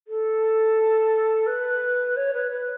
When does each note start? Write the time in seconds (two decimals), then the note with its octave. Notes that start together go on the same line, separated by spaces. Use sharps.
0.08 A4
1.47 B4
2.17 C#5
2.34 B4
2.51 B4